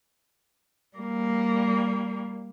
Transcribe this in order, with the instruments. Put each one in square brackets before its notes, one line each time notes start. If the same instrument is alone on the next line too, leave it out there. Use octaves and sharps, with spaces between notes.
[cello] G3 A#3